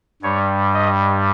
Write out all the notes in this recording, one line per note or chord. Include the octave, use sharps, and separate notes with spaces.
G2 G3 C#5
D#5